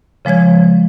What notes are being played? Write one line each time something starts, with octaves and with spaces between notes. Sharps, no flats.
C#3 F3 G#3 C#5 G#6